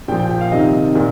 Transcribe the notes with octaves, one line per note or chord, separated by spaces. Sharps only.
A#2 F3 G5
G5
G5
F5
C3 D#3 D#5
A#2